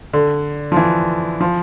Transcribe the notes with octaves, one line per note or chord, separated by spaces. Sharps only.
D3
F3
E3
F3